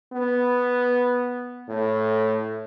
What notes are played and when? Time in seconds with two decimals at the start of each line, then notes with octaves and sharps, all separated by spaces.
0.13 B3
1.68 A2